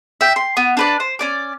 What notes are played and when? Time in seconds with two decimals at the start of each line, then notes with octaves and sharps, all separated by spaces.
0.21 E5 G5
0.36 C6
0.57 B3
0.77 D4 B4 D5
1.00 C5
1.19 C#4 D5 D6